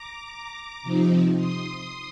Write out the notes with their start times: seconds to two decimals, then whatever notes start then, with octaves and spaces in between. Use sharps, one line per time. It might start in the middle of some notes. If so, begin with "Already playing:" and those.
Already playing: A#5 D6
0.83 C3 F3 C4 D#4
1.36 C6 D#6